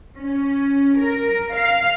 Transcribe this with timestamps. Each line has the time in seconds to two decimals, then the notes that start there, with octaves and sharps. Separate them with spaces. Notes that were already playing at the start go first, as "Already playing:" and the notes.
0.18 C#4
1.00 A#4
1.54 F5